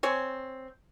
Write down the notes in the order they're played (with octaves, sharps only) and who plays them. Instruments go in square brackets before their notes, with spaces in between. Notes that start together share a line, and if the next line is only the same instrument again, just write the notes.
[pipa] C4 C#5 G#5